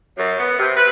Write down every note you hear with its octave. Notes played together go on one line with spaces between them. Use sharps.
F#2
B3
C3
B4